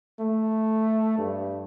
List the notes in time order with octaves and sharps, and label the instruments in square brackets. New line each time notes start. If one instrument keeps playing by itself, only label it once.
[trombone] A3
G2